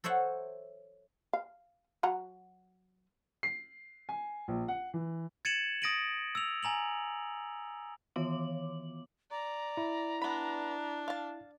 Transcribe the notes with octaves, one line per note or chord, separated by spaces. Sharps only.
A4 C5 C#5 E5 F#5
F5
F#3 F#5 A#5
C7
G#5
A#1
F#5
E3
G#6 A6 C#7 D#7 E7 F#7
D#6 A6 A#6 D7 D#7 F#7
E6 F7
G#5 A#5 F7 F#7
D#3 E3 B3 C#5 D6 F#7
D5 A#5
E4
B3 D4 B5
F5 A5